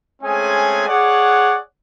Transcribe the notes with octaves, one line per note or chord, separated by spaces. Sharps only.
G#3 A3 C4 C#4 G#4 G#5
G#4 C#5 D5 F#5